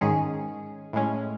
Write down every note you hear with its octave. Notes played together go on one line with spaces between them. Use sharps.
G#2 D#3 G#3 C#4 G#4
A2 G#3 C#4